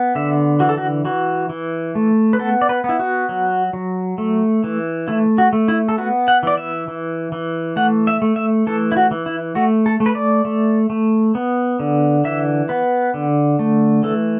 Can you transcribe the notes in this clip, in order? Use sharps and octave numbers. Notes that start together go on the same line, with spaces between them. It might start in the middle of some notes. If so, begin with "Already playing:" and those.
Already playing: B3
D3 E5
E3 F#4
A4
F#4
E3 F#4
E3
A3
B4
B3 A4
D5
B4
B3
E4
F#4
F#3
F#3
A3
E3
A3 E4
F#4
A3
E4
A4
B3 F#4
F#5
E3 D5
E5
E3
E3
A3 F#5
E5
A3
E5
E3 A4
E4
F#4
E3
E4
A3 F#4
A4
A3
B4
D5
A3
A3
B3
D3
E3 E5
B3 B4
D3
A3
E3 A4